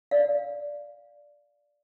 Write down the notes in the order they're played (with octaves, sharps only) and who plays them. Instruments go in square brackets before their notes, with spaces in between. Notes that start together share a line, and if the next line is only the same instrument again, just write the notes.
[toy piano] D5 F5